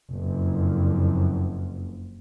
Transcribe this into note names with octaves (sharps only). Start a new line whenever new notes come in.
F#1 F2